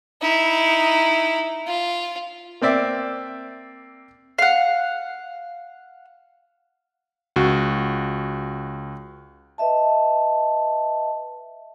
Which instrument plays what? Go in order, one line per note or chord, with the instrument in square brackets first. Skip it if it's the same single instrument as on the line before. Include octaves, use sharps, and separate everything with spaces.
[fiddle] D#4 E4
F4
[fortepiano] A#3 C4 D5 E5
[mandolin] F5 F#5
[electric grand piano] C#2 F#4
[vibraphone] B4 D#5 E5 A5